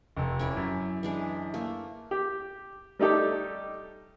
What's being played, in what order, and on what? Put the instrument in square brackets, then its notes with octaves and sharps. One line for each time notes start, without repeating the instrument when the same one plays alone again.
[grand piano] F1 A4
[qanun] C#4 E4 D5
[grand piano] F#2
[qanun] E3 G#3 D4
A3 A#3
[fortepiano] G4
G3 A3 D#4 G4 A4